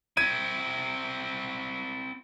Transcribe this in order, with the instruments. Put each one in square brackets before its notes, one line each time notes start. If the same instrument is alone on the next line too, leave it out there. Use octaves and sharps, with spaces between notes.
[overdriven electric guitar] C4 E4 [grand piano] G#6 D#7